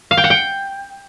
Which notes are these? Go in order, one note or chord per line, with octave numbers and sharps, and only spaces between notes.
F5
G5
F#5
G5